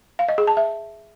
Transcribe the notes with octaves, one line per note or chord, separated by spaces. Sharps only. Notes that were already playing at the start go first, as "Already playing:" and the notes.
F5
D#5
G#4
A5
E5